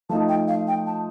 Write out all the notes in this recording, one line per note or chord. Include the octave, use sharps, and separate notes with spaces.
F3 A3 D#4 A5
G5
F5
G5
A5